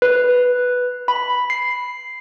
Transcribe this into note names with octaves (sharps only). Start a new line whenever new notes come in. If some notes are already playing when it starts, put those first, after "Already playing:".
B4
B5
C7